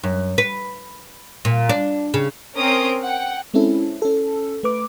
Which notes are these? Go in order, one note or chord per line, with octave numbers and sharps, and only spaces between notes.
F#2
B4
A#2
D4
C#3
C4 C#4 A#4 C6 D#6 D7
F#5 G5
G#3 C4 C#4 E4 A4
C#4 A4
A3 B4 D6